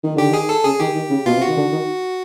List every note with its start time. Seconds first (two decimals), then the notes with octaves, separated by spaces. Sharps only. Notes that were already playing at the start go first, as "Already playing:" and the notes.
0.04 D#3
0.16 D3 G4
0.30 D#3 G#4
0.49 A4
0.65 C#3 G#4
0.80 D#3 G4
0.95 D#3
1.10 C#3
1.26 B2 F4
1.36 C3
1.41 F#4
1.47 D#3
1.57 D3
1.72 D#3